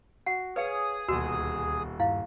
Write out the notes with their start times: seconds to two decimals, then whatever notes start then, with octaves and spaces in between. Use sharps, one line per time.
0.26 F#4 F#5
0.56 G#4 B4 C#5 F5 D#6 C#7
1.08 D#1 D2 B2 F#4 E6
2.00 G2 E4 F5